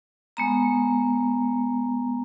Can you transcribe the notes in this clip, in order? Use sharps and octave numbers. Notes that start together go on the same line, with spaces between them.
G#3 B3 A#5